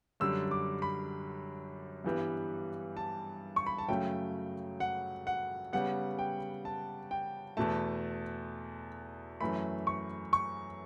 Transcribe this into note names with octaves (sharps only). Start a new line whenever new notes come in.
F#2 D3 G3 E6
D6
B5
G2 E3 G3 B3
A5
C#6
B5
A5
F#2 C#3 F#3 A3 G5
F#5
F#5
C#3 G3 B3 F#5
G5
A5
G5
E2 B2 A3 A5
F#2 E3 A3 B5
C#6
C#6